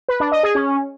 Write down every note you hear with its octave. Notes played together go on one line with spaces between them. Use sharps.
B4
D4
D#5
G#4
C#4